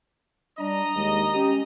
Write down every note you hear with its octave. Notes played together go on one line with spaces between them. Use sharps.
G3 D4 D#5 A#5
D#2 G#3
C#4 G4